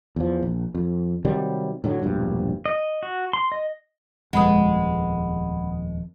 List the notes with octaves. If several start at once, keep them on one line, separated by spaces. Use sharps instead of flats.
E2 F3
A#1
F2
C3 D#3 F#3 G3
A2 D3 F#3
E1 A#1 G2
D#5
F#4
C6
D#5
D#1 F2 G#3 B3 F#5 B5 D#6